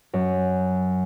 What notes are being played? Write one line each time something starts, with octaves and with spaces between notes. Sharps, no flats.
F#2